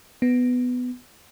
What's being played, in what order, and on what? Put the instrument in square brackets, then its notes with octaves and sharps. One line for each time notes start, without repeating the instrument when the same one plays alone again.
[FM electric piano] B3